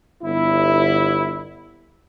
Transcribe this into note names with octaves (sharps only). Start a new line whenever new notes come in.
G1 E4